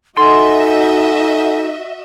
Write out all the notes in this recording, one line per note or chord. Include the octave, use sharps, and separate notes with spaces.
D#4 F#4 A4 D#5 E5 F#5 G#5 C6